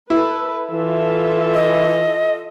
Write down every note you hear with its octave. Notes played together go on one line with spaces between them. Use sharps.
E4 A4 B4
E3 F4 A4 E5
D#5